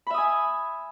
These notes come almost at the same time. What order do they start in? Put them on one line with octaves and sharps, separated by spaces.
B5 E5 D#6 G#5